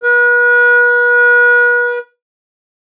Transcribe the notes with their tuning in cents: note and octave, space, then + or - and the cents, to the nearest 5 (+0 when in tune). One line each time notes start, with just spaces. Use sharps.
B4 -35